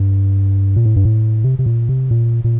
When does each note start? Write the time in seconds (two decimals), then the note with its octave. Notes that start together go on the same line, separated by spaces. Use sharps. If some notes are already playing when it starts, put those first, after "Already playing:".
Already playing: G2
0.76 A#2
0.86 A2
0.96 G2
1.05 A2
1.44 C3
1.59 C3
1.66 A#2
1.89 C3
2.11 A#2
2.44 A#2